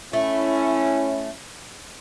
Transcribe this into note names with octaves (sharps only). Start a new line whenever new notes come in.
A3 C#4 E4